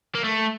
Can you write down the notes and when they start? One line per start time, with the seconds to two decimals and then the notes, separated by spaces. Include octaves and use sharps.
0.15 A#3
0.24 A3